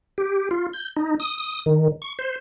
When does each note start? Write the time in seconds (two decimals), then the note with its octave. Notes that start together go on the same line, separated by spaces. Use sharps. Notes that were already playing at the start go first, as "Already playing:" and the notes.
0.18 G4
0.51 F4
0.73 G6
0.96 D#4
1.20 D#6
1.38 D#6
1.66 D#3
2.02 C#6
2.19 C5